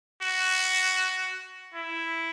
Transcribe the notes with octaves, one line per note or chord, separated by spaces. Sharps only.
F#4
E4